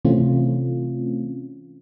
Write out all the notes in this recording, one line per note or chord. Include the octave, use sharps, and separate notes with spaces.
C3 E3 A3 C4 C#4 F4